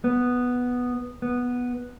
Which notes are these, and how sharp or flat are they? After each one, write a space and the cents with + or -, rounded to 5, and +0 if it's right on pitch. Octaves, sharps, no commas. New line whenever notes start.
B3 +0
B3 -5